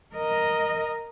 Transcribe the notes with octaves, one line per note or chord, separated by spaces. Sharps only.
A#4 D#5